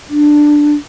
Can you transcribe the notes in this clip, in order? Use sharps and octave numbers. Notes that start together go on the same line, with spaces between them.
D4